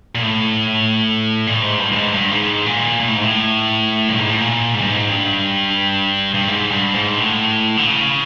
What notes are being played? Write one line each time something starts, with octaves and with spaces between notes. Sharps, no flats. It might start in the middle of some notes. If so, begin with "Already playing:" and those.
A#2
A2
A#2
A2
G#2
G2
G2
G#2
G2
G#2
A#2
A#2
A2
G#2
A2
G2
G#2
A2
A#2
G#2
G2
G#2
G2
G2
G#2
G2
G#2
A2
D3
C#3